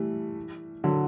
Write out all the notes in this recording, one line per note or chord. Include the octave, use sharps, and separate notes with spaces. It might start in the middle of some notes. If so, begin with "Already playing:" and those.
Already playing: E3 G3 A3
D3 F#3